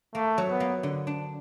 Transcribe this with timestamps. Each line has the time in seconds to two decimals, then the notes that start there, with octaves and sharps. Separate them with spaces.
0.15 A3 A#3
0.38 F#3
0.49 B3
0.60 A#3
0.83 D3
1.07 D4